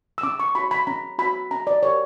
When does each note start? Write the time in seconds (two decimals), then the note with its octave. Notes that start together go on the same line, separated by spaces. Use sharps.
0.18 E6
0.23 C#4 D6
0.40 C#6
0.55 F#4 C#5 B5
0.71 B5
0.87 C#4 A#5
1.19 F#4 C#5 B5
1.51 C#4 A#5
1.67 D5
1.82 G4 A#4 C#5